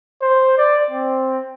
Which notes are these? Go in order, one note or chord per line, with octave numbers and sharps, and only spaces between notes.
C5
D5
C4